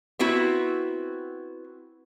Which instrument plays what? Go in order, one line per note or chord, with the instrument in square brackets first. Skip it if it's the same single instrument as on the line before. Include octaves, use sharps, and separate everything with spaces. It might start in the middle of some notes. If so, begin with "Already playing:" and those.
[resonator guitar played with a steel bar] B3 C4 E4 F#4